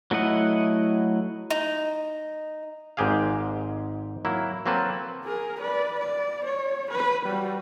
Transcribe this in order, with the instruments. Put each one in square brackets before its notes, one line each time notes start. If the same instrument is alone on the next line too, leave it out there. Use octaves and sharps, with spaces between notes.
[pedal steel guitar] F#3 A3 E4 D#5 F#5
[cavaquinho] D#4
[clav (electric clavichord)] G#1 G#2 G#3 G4 G#4 F5
F#3 A#3 E4
F#3 A#3 C4 A4 B4
[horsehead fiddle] G#4 A#4
B4 D5
D5
C#5
B4
G3 F#4